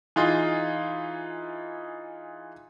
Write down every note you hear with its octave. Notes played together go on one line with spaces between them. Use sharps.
E3 D#4 F4 G#4